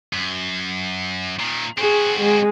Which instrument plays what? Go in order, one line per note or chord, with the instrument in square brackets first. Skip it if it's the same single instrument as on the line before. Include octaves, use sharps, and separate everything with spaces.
[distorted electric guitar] F#2
A#2 D#3
[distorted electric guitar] C4 F#4 [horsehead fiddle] G#4
[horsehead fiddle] G#3